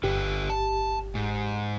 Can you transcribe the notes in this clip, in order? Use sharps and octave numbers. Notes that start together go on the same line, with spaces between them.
G1 D3 G4 B4
A5
G#2